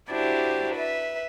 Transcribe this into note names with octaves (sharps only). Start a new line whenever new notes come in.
D4 E4 F#4 G4 C5
B4 E5